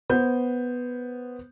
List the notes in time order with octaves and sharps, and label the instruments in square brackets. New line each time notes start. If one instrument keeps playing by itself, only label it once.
[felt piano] B3 C5 G6